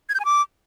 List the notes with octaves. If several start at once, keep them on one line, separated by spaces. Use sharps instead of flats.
G#6
G6
G#5
D6